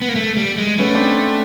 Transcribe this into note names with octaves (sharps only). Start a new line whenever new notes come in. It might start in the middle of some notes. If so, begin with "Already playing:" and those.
B3
A#3
A3
G3
G#3
A3 B3 C#4
C4 D4